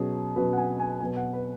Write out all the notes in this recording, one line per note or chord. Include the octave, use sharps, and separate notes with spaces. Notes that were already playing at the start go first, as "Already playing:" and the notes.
Already playing: B2 F#3 C#4 G#4
B2 F#3 C#4 B4
F#5
G#5
G#5
B2 F#3 B3 G#5
F#5
B4